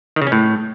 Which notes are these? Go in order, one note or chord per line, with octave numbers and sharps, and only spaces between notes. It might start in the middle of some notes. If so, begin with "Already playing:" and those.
D#3
C#3
C#4
A2